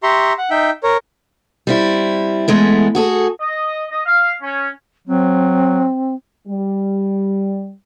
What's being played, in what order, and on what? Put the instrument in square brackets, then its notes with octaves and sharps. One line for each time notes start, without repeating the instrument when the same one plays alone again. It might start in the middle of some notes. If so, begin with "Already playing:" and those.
[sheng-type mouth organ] G4 E5 A#5 C6 C#6
F#5
D#4 E5 G5
A#4 C#5
[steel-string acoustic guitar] G3 C4 E4
E2 G#3 A3 B3
F#4 G#4 A4
[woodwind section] D#5
D#5
F5
C#4
[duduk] F#3 [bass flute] C4
[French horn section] G3